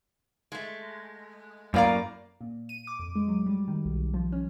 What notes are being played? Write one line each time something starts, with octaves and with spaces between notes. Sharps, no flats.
G#3 A3
F#2 A2 A#3 D5 F5 A#5
A#2
D#7
D6
F2
G#3
F#3
G3
D#3
B1
F3
C#4